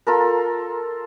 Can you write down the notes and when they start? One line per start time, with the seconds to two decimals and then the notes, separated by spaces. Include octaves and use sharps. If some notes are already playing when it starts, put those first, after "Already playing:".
0.07 F4 A4 A#4